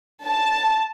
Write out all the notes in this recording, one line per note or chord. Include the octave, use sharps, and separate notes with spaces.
A5